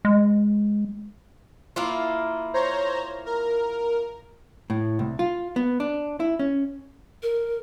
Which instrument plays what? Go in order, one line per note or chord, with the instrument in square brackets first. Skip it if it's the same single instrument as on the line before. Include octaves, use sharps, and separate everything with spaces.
[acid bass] G#3
[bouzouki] A#3 E4 F4
[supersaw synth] C5 C#5 A#5
A#4
[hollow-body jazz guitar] A2
C2
F4
B3
D4
E4
C#4
[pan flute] A#4